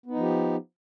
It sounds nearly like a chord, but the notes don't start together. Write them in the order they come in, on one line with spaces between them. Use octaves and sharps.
B3 D#4 F3 G4